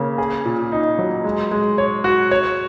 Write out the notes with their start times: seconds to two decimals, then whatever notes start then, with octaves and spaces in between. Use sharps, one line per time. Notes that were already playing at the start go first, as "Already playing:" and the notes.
Already playing: C#3 A#3
0.18 G#4
0.45 A#2
0.72 D#4
0.99 F#3
1.24 G#3
1.51 G#3
1.78 C#5
2.04 F#4
2.31 C#5